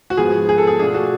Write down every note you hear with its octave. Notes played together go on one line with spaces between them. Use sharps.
F#4
G#2 F3 B3 G#4
G#4
A4
G#4
B2 A3 D4 F4 G#4
F#4